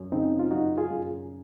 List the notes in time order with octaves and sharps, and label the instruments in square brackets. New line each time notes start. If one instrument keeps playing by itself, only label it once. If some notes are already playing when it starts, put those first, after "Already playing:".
Already playing: [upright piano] F#2
[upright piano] C#3 [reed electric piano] C4 D#4
[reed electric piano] F4
[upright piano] F#2 [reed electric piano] D#4 F#4
[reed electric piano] F4 G#4
[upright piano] F#2